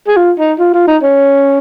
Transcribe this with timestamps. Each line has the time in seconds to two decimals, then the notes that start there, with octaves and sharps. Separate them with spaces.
0.07 G#4
0.16 F4
0.39 D#4
0.59 F4
0.74 F4
0.88 D#4
1.03 C#4